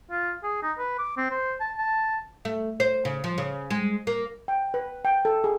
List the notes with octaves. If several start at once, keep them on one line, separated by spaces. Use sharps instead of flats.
F4
G#4
D#4
B4
D6
C4
C5
A5
A5
A3
C5
C#3
F3
C#3
G#3
A#3
G5
B4
G5
A4
G#4